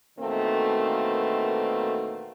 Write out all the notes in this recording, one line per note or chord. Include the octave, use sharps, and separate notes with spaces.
E2 B2 D#3 A3 A#3 C4